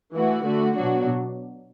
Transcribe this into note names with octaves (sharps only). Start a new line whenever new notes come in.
E3 A3 F#4
D3 A3 F#4
B2 F#3 D4 F#4